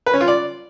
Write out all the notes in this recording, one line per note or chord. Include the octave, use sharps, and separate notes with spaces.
B4
C#4
F4
D5